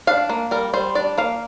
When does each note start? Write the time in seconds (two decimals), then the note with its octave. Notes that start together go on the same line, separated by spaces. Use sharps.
0.07 D4 F5
0.30 A#3
0.51 G3 A#4
0.73 G3 C5
0.95 D4 D5
1.18 A#3 F5